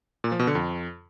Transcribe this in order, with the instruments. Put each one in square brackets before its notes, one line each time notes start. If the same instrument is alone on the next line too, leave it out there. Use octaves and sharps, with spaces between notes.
[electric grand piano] A#2
F3
B2
D3
F2